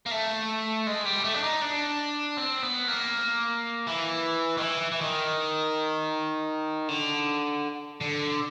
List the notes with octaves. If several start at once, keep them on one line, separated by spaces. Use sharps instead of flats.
A#3
A3
G#3
G3
A3
D4
D#4
D4
C4
B3
A#3
E3
D#3
E3
E3
D#3
D3
D3